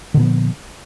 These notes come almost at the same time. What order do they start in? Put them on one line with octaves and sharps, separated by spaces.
D3 A#2 B3 F3